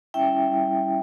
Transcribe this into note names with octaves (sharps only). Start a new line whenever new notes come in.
G3 C#4 E4 E5 G5
G3 C#4 E4